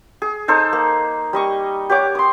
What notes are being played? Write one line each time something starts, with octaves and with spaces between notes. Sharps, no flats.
G#4
D#4 A4 C5
A#3
G3 D#5 C#6
G4 C#5 F#5 D6
C6 D#6